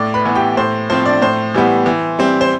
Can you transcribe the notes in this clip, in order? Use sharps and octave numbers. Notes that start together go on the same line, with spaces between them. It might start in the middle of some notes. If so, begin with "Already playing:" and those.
Already playing: A2 D5 D6
B4 B5
E3 B3
G4 G5
A2 C5
F3 C4 C5
D4 D5
A2 C5
E3 G3 B3
E3
G3 C4
C5